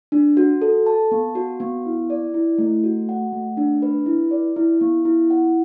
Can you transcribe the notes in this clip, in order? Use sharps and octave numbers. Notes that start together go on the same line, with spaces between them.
D4
F#4
A4
A5
B3
F#4
B3
E4
D5
E4
A3
F#4
F#5
A3
D4
B4
E4
D5
E4
B3
E4
F#5